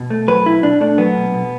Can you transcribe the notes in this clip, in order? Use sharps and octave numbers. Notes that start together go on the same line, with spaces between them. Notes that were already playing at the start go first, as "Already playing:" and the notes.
Already playing: B2
A3
F#3 B4
B2 E4
B2 D4
A3 D4
F#3 B3
B2
B2